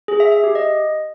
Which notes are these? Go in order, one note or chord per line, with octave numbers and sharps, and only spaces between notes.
G#4
E5
E5
G4
D#5